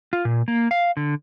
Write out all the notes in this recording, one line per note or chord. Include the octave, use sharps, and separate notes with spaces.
F4
A#2
A#3
F5
D3